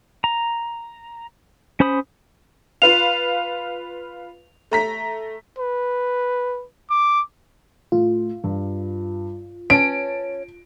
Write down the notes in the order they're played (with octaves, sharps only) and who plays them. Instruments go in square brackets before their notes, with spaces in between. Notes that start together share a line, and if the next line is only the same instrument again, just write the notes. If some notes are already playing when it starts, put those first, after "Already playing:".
[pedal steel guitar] A#5
C#4 C5 B5 D#6
[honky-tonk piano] F4 B4 F5 [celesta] F7
[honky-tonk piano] A3 A#5 B6
[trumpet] B4
D6
[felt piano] A2 [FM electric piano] F4
[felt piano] G2
[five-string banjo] C#4 [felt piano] B4 C#5 A5 [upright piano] D7